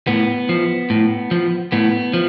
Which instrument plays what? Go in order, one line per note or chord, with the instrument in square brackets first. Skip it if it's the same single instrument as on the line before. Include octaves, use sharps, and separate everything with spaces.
[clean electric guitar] A2 B3
F3
A2
F3
A2 B3
F3